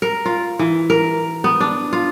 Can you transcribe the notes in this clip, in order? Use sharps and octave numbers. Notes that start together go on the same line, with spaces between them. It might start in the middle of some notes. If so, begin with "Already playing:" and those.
A#4
F4
E3
A#4
B3
D4
F4